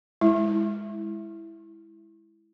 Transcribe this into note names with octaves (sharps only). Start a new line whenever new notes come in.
G#3 E4